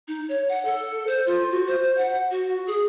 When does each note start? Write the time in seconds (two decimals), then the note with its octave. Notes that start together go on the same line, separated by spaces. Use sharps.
0.08 D#4
0.29 C#5
0.49 F#5
0.65 A4
1.07 C5
1.27 F4
1.51 F#4
1.67 C5
1.98 F#5
2.30 F#4
2.67 G#4